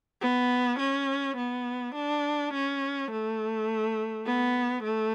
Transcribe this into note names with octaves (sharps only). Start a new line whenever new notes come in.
B3
C#4
B3
D4
C#4
A3
B3
A3